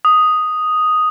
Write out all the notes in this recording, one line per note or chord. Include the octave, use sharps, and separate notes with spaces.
D#6